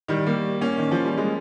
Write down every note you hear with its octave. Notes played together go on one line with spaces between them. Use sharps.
D#3 G3
G3 A#3
A#3 C#4
D#3
F3
G3
G#3